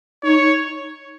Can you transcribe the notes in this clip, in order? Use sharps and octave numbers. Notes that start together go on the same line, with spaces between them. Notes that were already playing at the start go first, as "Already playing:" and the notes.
D#4 C#5